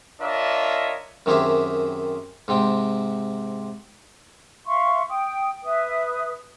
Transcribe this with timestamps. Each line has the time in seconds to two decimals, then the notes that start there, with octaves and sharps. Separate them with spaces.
0.21 D4 F4 A#4 C#5 D#5 E5
1.26 F#2 D#3 C4 G4 G#4 E5
2.48 G#2 C3 C4 G5
4.65 E5 F5 C6 C#6
5.09 G5 D#6
5.64 B4 E5 D#6